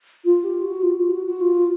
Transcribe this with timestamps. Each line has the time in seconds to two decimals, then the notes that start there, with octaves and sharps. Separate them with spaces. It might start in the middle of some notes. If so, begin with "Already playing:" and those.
0.25 F4
0.44 G4
0.63 F#4
0.82 F4
0.97 F4
1.11 F#4
1.26 F#4
1.41 F4